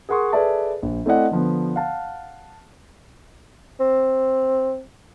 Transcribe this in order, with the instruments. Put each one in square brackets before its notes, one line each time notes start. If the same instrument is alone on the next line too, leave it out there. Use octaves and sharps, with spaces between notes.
[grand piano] G#4 A#4 F#5 C6 C#6 D#6
G#4 A4 B4 D5 E5 A5
A#1
A3 C4 E4 D5 D#5 F#5
D3 F3 B3
F5 F#5 A5
[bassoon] C4